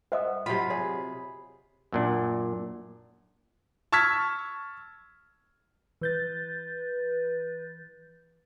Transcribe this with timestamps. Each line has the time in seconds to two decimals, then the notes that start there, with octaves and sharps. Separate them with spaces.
0.12 C5 D#5 E5 F#5 D#6
0.46 C3 F#3 F4 B5
0.70 G#4 C#5
1.93 F#2 A#2 D4
3.92 A5 C#6 E6 F6 G#6 B6
6.01 E3 B4 G6 A6